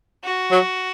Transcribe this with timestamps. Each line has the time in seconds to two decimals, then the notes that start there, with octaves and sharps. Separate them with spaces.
0.24 F#4
0.51 F#3